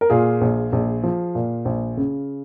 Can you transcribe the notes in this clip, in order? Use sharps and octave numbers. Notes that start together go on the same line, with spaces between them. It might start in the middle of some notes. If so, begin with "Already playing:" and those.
A#4
A#2 F4 G#4
A#1
A#1
F3
A#2
A#1
C#3